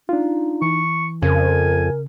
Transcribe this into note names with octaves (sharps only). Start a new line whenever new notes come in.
D4 D#4 F4
E3 C#6
F2 C#3 A#4 G#5